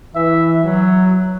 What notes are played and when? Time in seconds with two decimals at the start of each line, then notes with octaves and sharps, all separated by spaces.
0.15 E3 E5
0.64 F#3